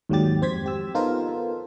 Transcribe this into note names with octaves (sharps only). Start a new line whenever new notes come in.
D#2 G#2 F#3 G3 G4 A6
F2 C4 C5 G#6 B6
G4 E6
B3 D#4 F4 A4 A#4 C5